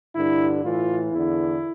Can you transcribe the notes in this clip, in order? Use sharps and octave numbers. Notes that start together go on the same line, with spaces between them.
G2 D3 E4
A2 E3 F4
E2 D3 E4